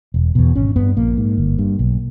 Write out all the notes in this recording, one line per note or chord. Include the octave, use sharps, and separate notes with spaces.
E1
E2 B2
G#1 C#4
G2 B3
A#1 A#3
G#2
G1
G2
B1